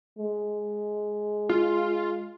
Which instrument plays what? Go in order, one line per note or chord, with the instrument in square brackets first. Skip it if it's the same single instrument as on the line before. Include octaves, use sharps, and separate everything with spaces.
[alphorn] G#3
[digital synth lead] F4